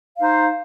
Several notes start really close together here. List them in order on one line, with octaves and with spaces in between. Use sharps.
F5 D#4 C5